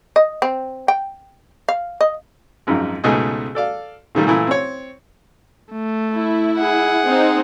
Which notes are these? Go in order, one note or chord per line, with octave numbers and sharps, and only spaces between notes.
D#5
C4
G5
F5
D#5
G#1 F#2 F3 D#4
C#2 G#2 B2 A3 G#4 D#5
A4 D5 F5
A#2 D#3 G3 A3
A#2 E3 A3 E4
C4 C#5
A3
E4
G#4 F#5
C4 D#4 C5